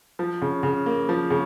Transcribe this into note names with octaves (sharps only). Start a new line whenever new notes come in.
F3
C#3
C#3
A#3
F3
C#3